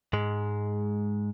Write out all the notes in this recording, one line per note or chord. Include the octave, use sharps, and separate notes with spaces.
G#2 G#3